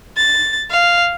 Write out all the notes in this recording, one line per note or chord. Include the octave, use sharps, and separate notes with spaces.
A6
F5